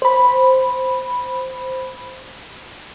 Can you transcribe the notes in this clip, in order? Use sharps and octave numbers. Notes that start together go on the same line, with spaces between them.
C5 B5